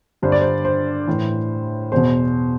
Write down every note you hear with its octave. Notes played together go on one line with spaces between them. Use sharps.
G2 D3 C5
D5
C5
C5
A2 E3
E2 B2 C5